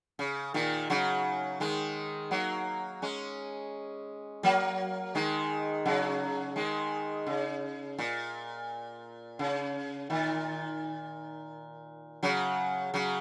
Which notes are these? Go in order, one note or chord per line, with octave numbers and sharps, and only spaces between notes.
C#3
A#2 D#3
C#3 F#3
D#3 G#3
F#3 A#3
G#3 C#4
F#3 A#3
D#3 G#3
C#3 F#3
D#3 G#3
C#3
A#2
C#3
A#2 D#3
C#3 F#3
C#3 F#3